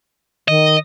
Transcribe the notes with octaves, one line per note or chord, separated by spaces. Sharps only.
D#3 D#5